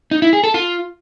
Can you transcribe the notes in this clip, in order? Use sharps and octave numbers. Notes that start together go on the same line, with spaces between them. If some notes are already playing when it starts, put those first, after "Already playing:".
D#4
E4
G#4
A4
F4